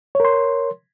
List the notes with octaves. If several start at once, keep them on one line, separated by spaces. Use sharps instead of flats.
A#4 C#5 C6